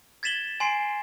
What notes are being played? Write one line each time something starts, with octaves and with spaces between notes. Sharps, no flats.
G#6 A6 B6 E7 F#7 G7
G#5 C6 C7 D7